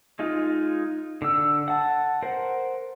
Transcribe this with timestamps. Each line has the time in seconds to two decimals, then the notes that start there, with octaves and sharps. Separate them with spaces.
0.19 G#3 D#4 F4
1.22 D3 E6
1.68 F#5 A5
2.22 A#4 C5 F#5